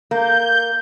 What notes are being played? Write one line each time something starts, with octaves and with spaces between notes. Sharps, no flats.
A#3 G6